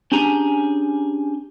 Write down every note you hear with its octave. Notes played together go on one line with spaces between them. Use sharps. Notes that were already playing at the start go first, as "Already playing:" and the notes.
C#4 D4 G4 G#4 G#5 A#5